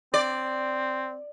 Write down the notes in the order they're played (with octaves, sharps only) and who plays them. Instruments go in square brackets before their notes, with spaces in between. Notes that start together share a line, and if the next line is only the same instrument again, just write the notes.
[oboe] C4 [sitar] D5